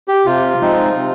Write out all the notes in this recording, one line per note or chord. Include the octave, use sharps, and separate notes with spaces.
G4
C3 F4
F3 G#3 C4 D#4
C3